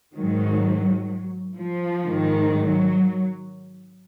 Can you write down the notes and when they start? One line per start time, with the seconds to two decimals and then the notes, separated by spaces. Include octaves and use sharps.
0.16 G#2 D#3 F#3
1.59 F3
2.07 G#2 D#3
2.55 F#3